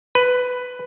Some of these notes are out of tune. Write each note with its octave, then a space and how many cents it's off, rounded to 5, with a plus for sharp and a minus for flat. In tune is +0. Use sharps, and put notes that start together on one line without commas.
B4 +10